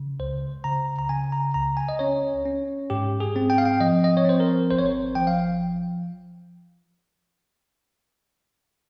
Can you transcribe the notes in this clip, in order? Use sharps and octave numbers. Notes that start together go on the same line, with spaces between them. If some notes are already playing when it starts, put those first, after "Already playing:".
Already playing: C#3
C#2 C5
C#3 A#5
A#5
C#3 G#5
A#5
C#2 A#5
G#5
D#5
C#4 C#5
C#4
G#2 G4
G#4
C4
G5
F5
G5
F3 D#5
D#5
C#5
C4 C5
A#4
G#1 C5
C#5
C5
F3 G5
F5